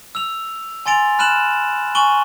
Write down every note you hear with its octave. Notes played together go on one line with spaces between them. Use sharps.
E6 F7
G#5 C6 A6 D7 F7
B5 F6 F#6 D#7 E7 F#7
G#5 C#6 D#7 F#7 G7